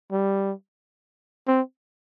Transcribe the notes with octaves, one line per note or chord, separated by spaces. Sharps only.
G3
C4